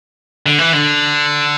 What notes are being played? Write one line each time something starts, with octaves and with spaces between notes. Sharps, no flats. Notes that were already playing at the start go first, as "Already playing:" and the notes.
D3
E3
D3